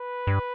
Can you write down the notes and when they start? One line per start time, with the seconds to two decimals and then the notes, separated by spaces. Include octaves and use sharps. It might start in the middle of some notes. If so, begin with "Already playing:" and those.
Already playing: B4
0.27 G2